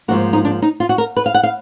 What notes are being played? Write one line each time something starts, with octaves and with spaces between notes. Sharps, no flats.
G#2 F3 A#3 F#4
D#4
D4
D#4
F4
F#4
A#4
B4
F5
F#5
F5